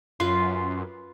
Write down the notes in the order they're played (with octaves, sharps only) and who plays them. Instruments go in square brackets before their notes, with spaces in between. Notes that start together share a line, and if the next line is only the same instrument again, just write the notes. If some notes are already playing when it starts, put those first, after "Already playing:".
[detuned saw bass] F#2 [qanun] F4 B4 [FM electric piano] C6